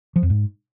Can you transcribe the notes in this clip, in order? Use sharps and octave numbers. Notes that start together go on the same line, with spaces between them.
F3
F2
G#2